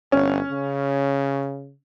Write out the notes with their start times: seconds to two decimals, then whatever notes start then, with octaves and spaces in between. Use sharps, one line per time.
0.12 G1 C#4
0.51 C#3